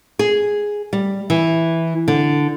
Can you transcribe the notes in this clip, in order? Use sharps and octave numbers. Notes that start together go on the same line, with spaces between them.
G#4
G3
E3
D3